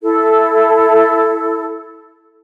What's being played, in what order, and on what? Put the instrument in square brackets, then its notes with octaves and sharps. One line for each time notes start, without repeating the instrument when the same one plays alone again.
[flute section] E4 A4